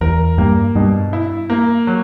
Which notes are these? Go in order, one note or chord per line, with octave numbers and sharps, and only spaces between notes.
E2 A#4
G2 A#3
G2 B2
E4
A#3
F#3